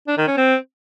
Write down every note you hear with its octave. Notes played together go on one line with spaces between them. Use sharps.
D4
D#3
C#4
C4